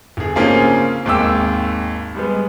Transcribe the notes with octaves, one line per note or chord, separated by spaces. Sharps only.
G1 G#4
C#3 A#3 C4 C#4 F4 G#4
G#1 D#2 G#3 G5 D6 E6
G3 G#3 B3